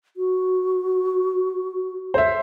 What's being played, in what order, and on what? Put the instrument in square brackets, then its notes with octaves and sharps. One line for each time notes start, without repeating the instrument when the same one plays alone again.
[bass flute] F#4
[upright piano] C5 E5